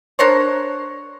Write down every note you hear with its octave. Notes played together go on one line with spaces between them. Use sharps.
D4 A#4 C5 C#5